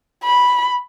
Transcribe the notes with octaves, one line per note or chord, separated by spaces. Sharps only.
B5